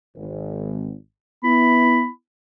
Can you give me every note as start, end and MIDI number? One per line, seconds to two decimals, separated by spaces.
0.15 0.93 32
1.44 2.05 59
1.44 2.05 64
1.44 2.10 83